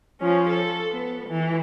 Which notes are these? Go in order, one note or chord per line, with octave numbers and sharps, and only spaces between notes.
F3 C#4
A4
B3
E3